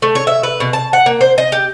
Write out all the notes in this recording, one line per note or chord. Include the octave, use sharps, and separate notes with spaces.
A3
C#5
E5
B4
B2
A5
F#5
A#3
C5
D#5
G4